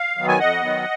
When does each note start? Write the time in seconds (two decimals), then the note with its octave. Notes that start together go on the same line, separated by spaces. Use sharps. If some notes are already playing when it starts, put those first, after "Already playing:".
Already playing: F5
0.17 D#3 F#3 B3
0.28 G#5
0.39 F2 D#5 F#5
0.62 D#3 F#3 B3